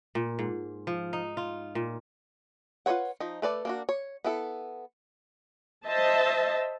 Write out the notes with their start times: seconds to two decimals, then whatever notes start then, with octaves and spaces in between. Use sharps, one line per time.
0.15 A#2
0.39 G#2
0.87 F3
1.13 D#4
1.37 F4
1.75 A#2
2.86 F4 A#4 B4 C#5 F#5
3.20 F3 D#4
3.42 A3 B4 D5 A5
3.65 A#3 D4 F#4
3.89 C#5
4.25 B3 E4 A4
5.86 C5 D#5 E5 A5